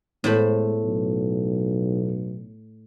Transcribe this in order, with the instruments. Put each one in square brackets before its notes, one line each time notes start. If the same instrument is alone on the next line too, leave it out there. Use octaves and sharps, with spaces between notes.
[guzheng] A2 C5 B5 [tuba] G#3 [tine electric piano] B3 E4 A4
[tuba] B1